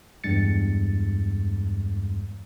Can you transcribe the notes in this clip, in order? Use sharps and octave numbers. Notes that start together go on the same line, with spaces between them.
E2 G2 G#3 A6 C#7